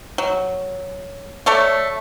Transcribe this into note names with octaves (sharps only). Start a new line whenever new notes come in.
F#3
A3 A4 C#5 D5